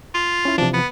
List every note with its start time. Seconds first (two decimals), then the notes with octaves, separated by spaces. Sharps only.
0.14 F4
0.45 C#4 E4
0.58 C3 E3 F3 D4
0.74 B3